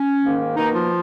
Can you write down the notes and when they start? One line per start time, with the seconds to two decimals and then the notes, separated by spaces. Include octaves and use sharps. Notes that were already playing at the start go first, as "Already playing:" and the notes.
Already playing: C#4
0.21 G#2 D#3 A#3
0.55 B2 D#3 A#3 D#4
0.73 F3 F4